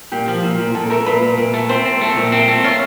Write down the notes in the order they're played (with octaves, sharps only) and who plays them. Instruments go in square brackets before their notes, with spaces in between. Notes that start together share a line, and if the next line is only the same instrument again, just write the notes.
[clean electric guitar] A#2 [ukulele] G4
[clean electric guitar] F3
A#2
A#2
[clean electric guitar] A#2 [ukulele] A4
[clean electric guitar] A3 [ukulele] A#4
[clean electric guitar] A#2 [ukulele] B4
[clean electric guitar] A#2
A#2
A3
[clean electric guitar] C4 [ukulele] C5
[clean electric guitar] C4
A3
A#2
C4
A3
[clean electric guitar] F4 [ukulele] C#5